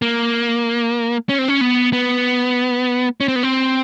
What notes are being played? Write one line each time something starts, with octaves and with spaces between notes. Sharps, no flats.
A#3
C#4
C4
C#4
B3
B3
C#4
C4
B3
C4